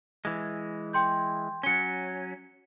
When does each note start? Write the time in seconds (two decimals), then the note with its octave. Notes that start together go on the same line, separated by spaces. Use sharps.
0.25 E3 G#3
0.93 G5 C6 G6
1.63 F#3 C#4 C#7 G7